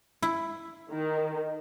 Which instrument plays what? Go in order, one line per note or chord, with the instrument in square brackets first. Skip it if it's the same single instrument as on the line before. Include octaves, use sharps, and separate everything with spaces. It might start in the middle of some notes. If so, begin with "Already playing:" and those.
[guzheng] E4
[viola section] D#3